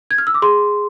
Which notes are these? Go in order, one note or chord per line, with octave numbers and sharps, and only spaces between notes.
G#6
F6
E6
D6
G#4 C6